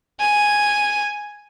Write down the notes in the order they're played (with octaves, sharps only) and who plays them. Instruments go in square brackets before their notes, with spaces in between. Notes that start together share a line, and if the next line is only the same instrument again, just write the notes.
[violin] G#5